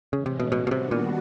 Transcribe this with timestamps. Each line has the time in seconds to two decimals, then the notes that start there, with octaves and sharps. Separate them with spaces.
0.12 A2 C#3 E3 G#3 C#4
0.26 C3
0.40 B2
0.52 B2 D#3 G3 B3 D4 F#4
0.67 B2
0.71 C3
0.91 A#2